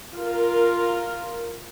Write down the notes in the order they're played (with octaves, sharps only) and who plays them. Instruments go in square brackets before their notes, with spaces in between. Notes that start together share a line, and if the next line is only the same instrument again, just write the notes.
[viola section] F4 A#4